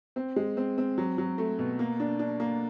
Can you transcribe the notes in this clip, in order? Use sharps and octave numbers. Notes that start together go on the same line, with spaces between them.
C4
G#3
C4
C4
F#3
F#3
A3
B2
A#3
D4
D4
A#3